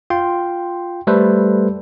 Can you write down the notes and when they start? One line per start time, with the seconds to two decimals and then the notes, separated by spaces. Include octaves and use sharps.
0.10 F4 G5 C6
1.07 G3 A3 A4 B4 C5